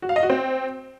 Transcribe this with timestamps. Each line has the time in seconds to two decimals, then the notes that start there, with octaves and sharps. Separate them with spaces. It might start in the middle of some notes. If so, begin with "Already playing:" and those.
0.02 F#4
0.09 F5
0.16 D#5
0.23 F#4
0.30 C4